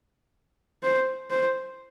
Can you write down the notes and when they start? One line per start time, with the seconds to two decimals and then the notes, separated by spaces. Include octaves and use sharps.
0.83 C5
1.31 C5